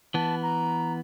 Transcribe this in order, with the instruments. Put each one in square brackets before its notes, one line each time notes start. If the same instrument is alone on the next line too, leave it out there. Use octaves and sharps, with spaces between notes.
[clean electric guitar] E3 B3 [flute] A5
[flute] A#5